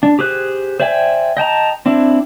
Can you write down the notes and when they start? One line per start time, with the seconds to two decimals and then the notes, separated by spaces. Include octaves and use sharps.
0.03 D4
0.19 G4 G#4 C5 F#6
0.80 C5 D5 E5 G5 G#5
1.37 D#5 G5 A5 A#5
1.86 C4 D4 E4